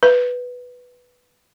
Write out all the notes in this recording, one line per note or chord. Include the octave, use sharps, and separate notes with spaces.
B4